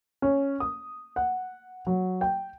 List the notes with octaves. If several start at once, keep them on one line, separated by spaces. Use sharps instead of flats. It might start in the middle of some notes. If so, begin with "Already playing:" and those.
C#4
D#6
F#5
F#3
G5